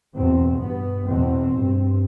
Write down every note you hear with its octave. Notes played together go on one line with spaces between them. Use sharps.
E2 B2 C4
G2 B3
E2 B2 C4
G2